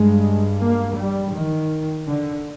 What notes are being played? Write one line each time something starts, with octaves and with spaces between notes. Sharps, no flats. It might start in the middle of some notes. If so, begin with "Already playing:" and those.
Already playing: G2 G#3
A#3
G3
D#3
D3